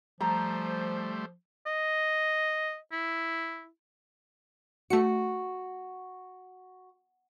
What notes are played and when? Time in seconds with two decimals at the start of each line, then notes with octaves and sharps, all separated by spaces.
0.21 F3 G3 A3 C5 A#5
1.66 D#5
2.92 E4
4.90 A3 F#4 C#7